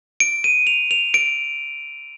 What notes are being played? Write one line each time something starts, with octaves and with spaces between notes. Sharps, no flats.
D7
D#7
F7
F7
D7